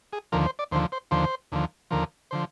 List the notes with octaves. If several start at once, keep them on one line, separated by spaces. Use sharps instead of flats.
G#4
D#2 D3 F3 A#4
C5
D5
D#2 D3 F3 C5
C5
D#2 D3 F3 C5
D#2 D3 F3
D#2 D3 F3 A#4
D3 F3 C5